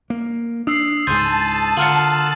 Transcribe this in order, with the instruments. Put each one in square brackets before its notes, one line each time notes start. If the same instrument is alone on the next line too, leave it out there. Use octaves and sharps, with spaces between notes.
[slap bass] A#3
[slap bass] D4 [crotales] D#6 E6 C7
[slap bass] C#2 G#2 [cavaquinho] G#4 C5 [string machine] A5 [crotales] A6 C7 D#7
[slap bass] D3 [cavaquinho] F4 A#4 F#5 [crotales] F#7